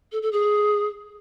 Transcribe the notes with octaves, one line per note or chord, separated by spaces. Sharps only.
A4
A4
G#4